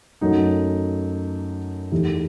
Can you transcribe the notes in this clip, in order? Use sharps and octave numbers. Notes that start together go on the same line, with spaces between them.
F#2 F#3 A3 D#4
E2 D#3 A3 E4 G4